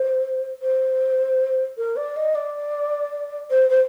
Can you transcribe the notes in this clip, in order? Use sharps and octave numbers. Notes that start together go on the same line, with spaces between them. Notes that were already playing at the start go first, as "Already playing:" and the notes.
Already playing: C5
C5
A#4
D5
D#5
D5
C5
C5